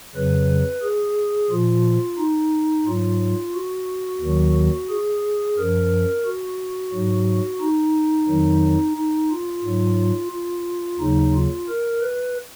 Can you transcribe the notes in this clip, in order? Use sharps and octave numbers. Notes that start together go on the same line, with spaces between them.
F2 C#3 F#3 B4
G#4
A#2 F3 F4
D#4
G#2 F#3 F4
F#4
D#2 D#3 F#3
G#4
F#2 F3 A#4
F#4
G#2 F#3
D#4
F2 D#3 F#3
D#4
F4
G#2 F#3
F4
D#2 C#3 F#3 D#4
F4
A#4
B4